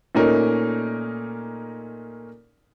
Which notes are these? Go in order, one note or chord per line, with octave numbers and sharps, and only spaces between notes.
A#2 A3 C#4 D#4 A#4